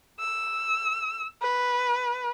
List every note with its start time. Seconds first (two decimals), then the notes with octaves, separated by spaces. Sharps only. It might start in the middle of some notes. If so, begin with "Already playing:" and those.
0.20 E6
1.42 B4